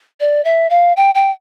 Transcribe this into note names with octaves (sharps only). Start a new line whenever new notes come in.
D5
E5
F5
G5
G5